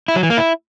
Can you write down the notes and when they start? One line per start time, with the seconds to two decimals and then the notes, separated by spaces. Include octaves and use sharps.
0.08 E4
0.16 F#3
0.23 E3
0.30 A#3
0.37 E4